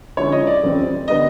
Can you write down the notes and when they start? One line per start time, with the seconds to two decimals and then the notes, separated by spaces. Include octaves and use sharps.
0.17 D3 F3 G#3 C#4 E4 C#5
0.32 D#5
0.47 D5
0.63 F2 C#3 E3 G3 C4
1.08 D3 G3 B3 D#5